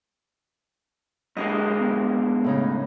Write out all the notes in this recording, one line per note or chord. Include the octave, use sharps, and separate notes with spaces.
F#2 D3 G#3 D#5
B3
A2 C#3 D#4